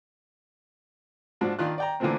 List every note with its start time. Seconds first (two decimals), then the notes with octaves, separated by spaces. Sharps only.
1.41 G#2 F3 D4 F#4
1.59 D#3 D4 F4 F#6
1.78 D5 G5 A#5
2.00 D3 E3 F3 A3 A#3 C4